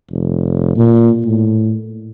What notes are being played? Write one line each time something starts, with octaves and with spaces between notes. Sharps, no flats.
F1
A#2
A2